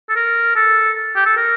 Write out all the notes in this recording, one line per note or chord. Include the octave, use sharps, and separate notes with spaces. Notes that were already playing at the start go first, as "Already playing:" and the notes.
A4
A#4
A4
G4
A4
A#4